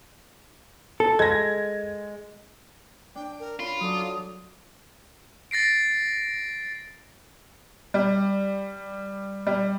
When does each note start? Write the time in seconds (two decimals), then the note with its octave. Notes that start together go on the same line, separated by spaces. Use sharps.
1.00 A4
1.19 G#3 G#6 A#6
3.15 D4 G5
3.40 A#4
3.60 C#4 F4 B5
3.80 F#3 A4 D5 D#6
5.51 A6 A#6 C7 D7
7.94 G3
9.47 G3